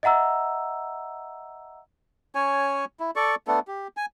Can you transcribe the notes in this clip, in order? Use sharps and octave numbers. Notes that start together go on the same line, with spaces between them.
D#5 E5 F#5 A#5 E6
C#4 C#5 G#5
E4
A4 D5 C#6
A3 B3 D4 A4
G4
G#5